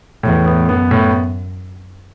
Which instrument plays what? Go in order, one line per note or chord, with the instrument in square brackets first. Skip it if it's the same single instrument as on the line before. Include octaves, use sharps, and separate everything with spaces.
[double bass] E2 [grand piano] A2
[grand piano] B3
[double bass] F#2 [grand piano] B3
[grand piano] A2